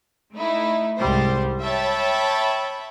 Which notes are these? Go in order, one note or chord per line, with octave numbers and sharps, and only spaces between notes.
A3 D#4 E4
C2 G#2 G3 C5
C#5 E5 G5 A5 B5